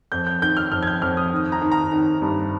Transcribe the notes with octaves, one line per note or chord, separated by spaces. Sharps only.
F2 G6
G6
D#3 G6
F6
F2 F6
G#6
G6
F2 F6
D#6
D#3
A#5
D#3
A#5
D#3
G2